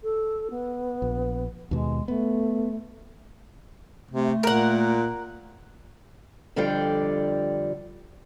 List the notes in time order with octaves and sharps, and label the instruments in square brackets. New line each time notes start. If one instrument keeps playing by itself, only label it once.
[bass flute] A4
B3
[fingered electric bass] A#1
[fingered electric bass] D#2 B2 [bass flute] G#3
[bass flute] A3 [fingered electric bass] B3
[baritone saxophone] C3 [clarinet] A3
[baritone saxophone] A#2 [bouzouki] A#4 F#5
[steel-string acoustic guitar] F2 D3 G3 F4 D5 G5